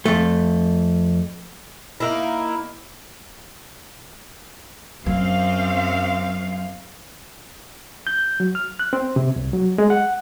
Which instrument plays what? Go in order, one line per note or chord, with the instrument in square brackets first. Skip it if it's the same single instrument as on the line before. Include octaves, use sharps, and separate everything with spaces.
[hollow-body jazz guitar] F2 A3
[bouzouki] A#3 D#4 E4
[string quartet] F#2 [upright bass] F#3 [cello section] C4 F5
[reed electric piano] G6
F#3
F6
F#6
C4
C3
C2
F#3
G#3
F#5